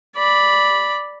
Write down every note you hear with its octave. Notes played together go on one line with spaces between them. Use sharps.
D5 B5